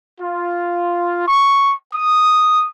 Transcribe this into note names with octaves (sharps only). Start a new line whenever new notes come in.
F4
C#6
D#6